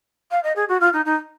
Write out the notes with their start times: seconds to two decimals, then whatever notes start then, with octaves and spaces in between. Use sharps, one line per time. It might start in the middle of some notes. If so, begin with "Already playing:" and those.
0.31 F5
0.43 D#5
0.55 G#4
0.68 F#4
0.80 F4
0.93 D#4
1.05 D#4